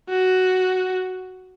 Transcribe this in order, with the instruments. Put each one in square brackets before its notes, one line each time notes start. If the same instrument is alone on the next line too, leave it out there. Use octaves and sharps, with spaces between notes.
[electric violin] F#4